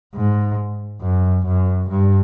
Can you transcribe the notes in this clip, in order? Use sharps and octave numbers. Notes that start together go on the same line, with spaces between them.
G#2
F#2
F#2
G2